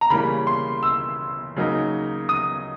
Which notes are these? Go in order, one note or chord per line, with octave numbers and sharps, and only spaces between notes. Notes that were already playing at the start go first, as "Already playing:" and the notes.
A#5
C#3 E3 G3 A#3 C#4 B5
C6
E6
C#3 F#3 A#3 D#4
D#6